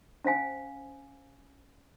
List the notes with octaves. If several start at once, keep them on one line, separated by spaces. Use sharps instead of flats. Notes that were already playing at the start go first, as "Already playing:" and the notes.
C#4 C5 F5 G#5